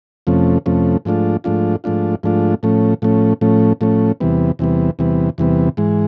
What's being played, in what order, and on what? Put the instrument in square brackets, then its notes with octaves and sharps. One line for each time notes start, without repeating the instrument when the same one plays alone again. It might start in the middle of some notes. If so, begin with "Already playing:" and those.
[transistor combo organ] F2 C3 F3 A3 C#4
F2 C3 F3 A3 C#4
G#2 F3 A3 D4 F4
G#2 F3 A3 D4 F4
G#2 F3 A3 D4 F4
G#2 F3 A3 D4 F4
A2 F3 A3 C#4
A2 F3 A3 C#4
A2 F3 A3 C#4
A2 F3 A3 C#4
E2 C3 E3 G3 B3
E2 C3 E3 G3 B3
E2 C3 E3 G3 B3
E2 C3 E3 G3 B3
G#2 E3 G#3